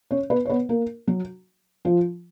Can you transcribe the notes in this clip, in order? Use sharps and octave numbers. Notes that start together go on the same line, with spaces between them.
C#4 C#5
B3 B4
C#5
B3 B4
A#3 A#4
F#3 F#4
F3 F4